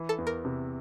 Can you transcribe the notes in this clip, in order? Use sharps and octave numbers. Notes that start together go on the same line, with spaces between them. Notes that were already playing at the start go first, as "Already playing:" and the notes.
Already playing: E3
A4
E2
A#4
C3